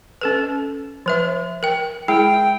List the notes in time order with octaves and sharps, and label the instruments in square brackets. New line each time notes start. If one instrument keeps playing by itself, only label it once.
[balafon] C#4 A4 B4
F3 B4 E5
A#4 G5
[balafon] G#3 E4 G#4 [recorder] G5